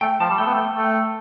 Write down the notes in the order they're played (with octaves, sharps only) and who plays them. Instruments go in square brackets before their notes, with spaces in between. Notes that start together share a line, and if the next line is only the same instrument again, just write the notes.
[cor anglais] A3 [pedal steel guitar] G5
[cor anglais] F3 [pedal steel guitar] A5
[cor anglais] G3
[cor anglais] A3 [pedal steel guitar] G5
[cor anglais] B3
A3
A3